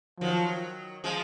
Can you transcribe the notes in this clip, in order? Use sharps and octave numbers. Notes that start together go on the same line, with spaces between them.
D#3 F3 F#3
F3 G#3